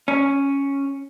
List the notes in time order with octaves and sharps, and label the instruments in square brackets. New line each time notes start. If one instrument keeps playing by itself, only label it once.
[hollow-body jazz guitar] C#4